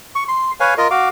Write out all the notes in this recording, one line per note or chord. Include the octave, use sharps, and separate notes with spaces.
C#6
C6
B4 C#5 F5 G#5
F4 A#4 D#5
F#4 F5 D6